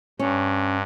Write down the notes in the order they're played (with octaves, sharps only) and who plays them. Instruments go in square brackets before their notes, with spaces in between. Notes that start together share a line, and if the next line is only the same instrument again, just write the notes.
[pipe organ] G2 [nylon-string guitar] C#4